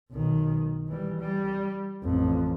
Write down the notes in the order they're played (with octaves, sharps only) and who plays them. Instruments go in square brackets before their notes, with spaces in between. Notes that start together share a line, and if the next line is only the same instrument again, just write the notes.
[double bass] B1 D#3
E3 G3
G3
A1 F2